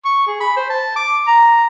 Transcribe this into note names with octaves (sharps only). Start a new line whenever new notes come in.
C#6
G#4
B5
C5
A5
D6
A#5